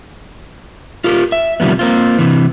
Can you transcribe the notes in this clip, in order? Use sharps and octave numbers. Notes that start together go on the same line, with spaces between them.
F4 G4 A#4
E5
C3 D#3 F3 G3 B3
A#3 C4 F4
C3 E3